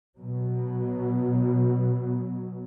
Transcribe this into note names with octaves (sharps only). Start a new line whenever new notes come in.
B2 F#3